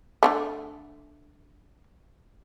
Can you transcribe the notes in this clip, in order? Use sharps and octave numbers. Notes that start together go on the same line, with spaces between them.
D3 F3 A3